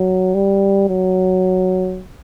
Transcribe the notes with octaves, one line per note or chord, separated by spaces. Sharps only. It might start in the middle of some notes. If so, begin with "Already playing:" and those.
Already playing: F#3
G3
F#3